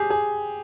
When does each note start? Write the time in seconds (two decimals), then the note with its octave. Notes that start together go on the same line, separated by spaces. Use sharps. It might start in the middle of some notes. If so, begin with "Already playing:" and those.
Already playing: G4 G#4
0.10 G#4